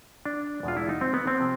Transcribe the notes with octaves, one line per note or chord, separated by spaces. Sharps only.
D4
E2 B2 G#3 F4
E4
D#4
C4
B3
C4
C3 F3